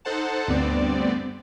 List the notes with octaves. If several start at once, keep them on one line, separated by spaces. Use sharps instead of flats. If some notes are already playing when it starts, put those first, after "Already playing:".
D#4 A4 C5 F#5 A5
D2 G2 B3 C4 D5